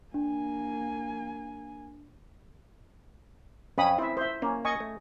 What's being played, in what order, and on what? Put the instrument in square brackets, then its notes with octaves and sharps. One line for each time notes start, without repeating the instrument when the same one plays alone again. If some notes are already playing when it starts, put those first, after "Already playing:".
[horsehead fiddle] A#3 G#5 [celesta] D4
[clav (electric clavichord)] F2 [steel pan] C#4 B5 D#6
[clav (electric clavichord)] C4 [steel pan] E4 E5
[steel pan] C5 E5
[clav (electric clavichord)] A#3 [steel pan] C#4
[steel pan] D#5 G#5 C#6
[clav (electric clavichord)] A3